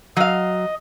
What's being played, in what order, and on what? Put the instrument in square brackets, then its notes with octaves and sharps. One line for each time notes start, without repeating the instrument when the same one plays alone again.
[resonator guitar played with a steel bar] F#3 F5 [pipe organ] D#5